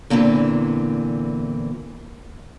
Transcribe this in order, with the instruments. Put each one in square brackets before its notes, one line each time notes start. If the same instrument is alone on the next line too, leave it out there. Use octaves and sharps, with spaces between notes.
[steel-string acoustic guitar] E2 A#2 D3 E3 C4